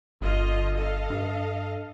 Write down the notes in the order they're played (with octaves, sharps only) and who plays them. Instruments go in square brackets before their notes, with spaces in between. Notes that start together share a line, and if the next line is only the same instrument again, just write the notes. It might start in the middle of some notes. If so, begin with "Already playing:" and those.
[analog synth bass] G1 [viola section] D3 F4 D#5
[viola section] A4 D#5 F5
[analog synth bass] G2